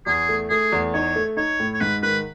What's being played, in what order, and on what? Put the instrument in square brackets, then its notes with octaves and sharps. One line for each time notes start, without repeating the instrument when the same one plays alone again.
[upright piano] E2 [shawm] G#4
[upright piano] A3
[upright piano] A3 [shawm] G#4
[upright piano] E2
[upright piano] D#4 [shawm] C#5
[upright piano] A3
[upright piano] D#4 [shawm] C#5
[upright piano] A2
[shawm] C#5
[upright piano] G#2 [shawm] B4
[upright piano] D#3 [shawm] B4